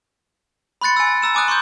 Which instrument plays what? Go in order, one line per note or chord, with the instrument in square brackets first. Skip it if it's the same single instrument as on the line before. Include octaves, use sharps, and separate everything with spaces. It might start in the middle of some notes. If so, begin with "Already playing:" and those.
[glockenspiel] B5 C6 F#6 A6 C#7
G#5 E6
A#5 E6 E7
G#5 D6 D#6 F#6
C6 C#6 E6 G6